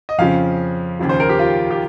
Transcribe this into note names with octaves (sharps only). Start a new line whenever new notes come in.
D#5
F2 C#3 F3 F5
D#2 C#3 F3
C5
A#4
G4
F4
G4